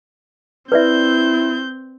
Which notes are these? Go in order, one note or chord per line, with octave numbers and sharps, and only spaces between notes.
C4 E4 B4 D5 E5 G6